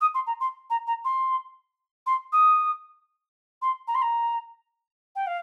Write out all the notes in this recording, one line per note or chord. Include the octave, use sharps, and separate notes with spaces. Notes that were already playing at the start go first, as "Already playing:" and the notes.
D#6
C6
A#5
C6
A#5
A#5
C6
C6
D#6
C6
A#5
C6
A#5
G5
F5